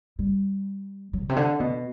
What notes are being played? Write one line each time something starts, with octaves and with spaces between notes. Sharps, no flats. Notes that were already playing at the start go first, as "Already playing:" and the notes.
G3
F#3
B2
C3
D3
B2